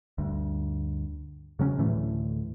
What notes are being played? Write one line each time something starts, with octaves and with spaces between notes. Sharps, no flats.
D2 G2
C#3 F#3 C4 C#4
D2 A2 E3 A3